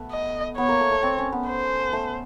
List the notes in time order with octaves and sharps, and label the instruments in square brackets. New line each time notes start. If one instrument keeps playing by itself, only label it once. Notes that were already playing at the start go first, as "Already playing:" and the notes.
Already playing: [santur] A3 B3
[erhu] D#5
[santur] B3 [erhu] C#5
[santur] A#3
A3
A3
C4
C#4
B3
[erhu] C5
[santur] A3